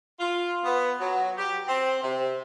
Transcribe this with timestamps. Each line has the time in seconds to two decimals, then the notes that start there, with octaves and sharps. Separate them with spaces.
0.19 F4
0.63 B3
1.00 F#3
1.36 G4
1.67 C4
2.02 C3